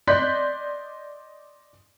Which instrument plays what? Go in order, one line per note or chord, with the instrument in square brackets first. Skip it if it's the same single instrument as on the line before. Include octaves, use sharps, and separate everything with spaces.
[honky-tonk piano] D5 D#5 C6 F#6 G6 B6